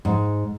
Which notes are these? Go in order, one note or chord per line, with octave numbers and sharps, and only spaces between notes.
G#2